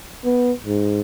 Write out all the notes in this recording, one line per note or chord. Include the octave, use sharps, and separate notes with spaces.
B3
G#2